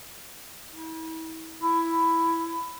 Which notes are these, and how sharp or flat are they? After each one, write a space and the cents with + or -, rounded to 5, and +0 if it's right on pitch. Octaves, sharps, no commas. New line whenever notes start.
E4 -40
E4 +10